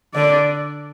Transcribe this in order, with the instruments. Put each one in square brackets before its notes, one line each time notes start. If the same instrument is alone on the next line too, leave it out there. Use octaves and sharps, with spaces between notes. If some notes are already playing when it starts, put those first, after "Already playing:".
[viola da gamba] D3 [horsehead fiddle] D5